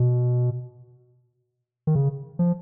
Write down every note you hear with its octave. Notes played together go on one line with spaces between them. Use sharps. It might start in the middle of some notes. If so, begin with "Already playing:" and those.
Already playing: B2
D#3
C#3
F3